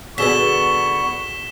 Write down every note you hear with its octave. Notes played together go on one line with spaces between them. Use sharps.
D3 B3 F#4 G#4 C#6 B6 E7 G7